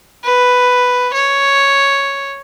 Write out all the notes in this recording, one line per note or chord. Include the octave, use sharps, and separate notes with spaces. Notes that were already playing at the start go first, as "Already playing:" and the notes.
B4
C#5